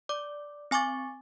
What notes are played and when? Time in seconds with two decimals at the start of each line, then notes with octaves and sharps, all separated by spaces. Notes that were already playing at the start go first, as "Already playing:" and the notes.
0.09 D5 D6
0.71 C4 G#5 C#6 D6 A6